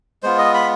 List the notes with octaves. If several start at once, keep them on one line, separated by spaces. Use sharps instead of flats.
G#3 B3 F4 C5
D#5
B5